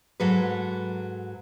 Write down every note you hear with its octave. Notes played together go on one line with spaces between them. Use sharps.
G#2 F#3 A4 B4